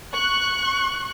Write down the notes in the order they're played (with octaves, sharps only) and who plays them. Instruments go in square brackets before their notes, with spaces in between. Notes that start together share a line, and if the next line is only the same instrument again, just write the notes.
[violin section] C#6 F#6